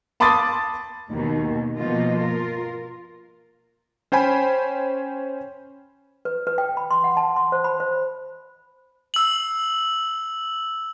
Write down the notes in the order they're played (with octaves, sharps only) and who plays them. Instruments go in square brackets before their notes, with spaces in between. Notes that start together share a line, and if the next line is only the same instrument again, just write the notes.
[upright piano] A5 B5 C6 D6 D#6 A6
[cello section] D#2 B2 D#3
B2 F3 A#3 B3 F4 D#5
F4 A#4
[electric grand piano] C#4 C5 G5 G#5 B5
[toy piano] B4
B4
G5
B5
C6
F#5
A5
C6
C5
B5
C5
[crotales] E6 F#7